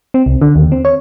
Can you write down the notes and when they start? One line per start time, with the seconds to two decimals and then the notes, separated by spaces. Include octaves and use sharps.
0.14 C4
0.26 C2
0.42 D3
0.56 D#2
0.72 C4
0.85 C#5